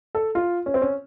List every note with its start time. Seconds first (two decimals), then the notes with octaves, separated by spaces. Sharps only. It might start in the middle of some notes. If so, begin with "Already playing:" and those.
0.15 A4
0.35 F4
0.66 C#4
0.74 C4
0.81 C#4